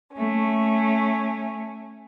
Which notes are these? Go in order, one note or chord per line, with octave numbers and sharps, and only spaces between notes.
A3 C#4